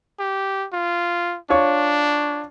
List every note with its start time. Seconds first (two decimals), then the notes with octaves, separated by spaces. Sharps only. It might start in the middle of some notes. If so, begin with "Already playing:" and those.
0.19 G4
0.73 F4
1.50 D4 F4 C#5 C#6